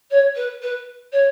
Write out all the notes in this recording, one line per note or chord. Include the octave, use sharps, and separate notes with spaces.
C#5
B4
B4
C#5